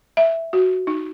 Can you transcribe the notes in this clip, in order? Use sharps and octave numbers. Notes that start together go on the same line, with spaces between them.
E5
F#4
D#4